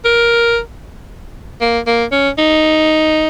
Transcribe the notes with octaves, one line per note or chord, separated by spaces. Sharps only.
A#4
A#3
A#3
C#4
D#4